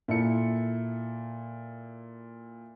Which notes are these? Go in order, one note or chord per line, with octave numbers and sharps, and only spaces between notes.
A#2 E4 A4 E5 C#7